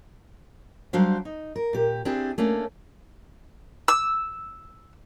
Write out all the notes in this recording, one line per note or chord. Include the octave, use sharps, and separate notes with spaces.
F#3 G3 D4 F#4 C5 F5
D#4
A#4
A#2 G4
C4 D4 E4 G4 G#4
A3 A#3 C#4 D4
E6